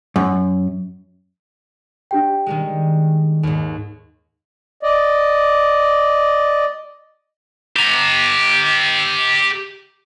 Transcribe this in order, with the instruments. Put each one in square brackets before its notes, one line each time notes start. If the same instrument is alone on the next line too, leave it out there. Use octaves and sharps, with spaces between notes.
[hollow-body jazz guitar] F#2
[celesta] D4 G4 G5
[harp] D#3 G3 G#3
D#2 G#2
[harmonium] D5 D#5
[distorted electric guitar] G4 A#5